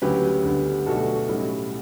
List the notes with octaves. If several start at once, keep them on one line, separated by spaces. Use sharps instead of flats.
D2 C#3 F#3 G4 B4
D2 D3 G3 B3
B1 B2 A3 D4 F#4 A4
B1 A2 G3 C#4